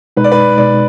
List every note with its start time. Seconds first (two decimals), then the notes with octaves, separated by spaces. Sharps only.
0.17 B2 G#3 D#4 B4
0.24 D5
0.32 B4
0.57 B2 G#3 D#4 D5